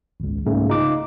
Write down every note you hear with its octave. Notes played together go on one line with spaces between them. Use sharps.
G#1 C#2
C2 G#2 C#3 A3 A#3
D#4 F4 D6